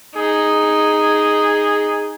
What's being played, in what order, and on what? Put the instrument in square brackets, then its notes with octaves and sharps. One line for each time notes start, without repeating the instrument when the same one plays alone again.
[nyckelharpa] D#4 [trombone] G#4